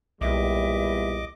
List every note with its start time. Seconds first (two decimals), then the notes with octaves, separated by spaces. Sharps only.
0.21 B1 E2 A#2 G3 D#5 E5 D6